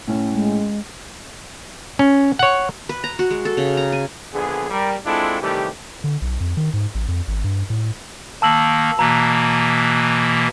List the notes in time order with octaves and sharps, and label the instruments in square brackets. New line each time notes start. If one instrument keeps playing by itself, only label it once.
[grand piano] A2 C#4
[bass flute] G#3
[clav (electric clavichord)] C#4
C#5 F#5
[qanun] B4
A#5
F#4
G#3
A4
C#3
A#5
G#5
[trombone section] A#1 D3 B3 G#4
G3 A#4
G#3 C4 D4 E4 F4 A4
C3 D#3 E3 G3 A3 G4
[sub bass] D3
B1
F2
D#3
G#2
A1
F2
G#1
G2
A2
[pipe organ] D#3 A#3 [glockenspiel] A5 E6 F#7
[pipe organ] B2 E3 A#3 [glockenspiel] A#5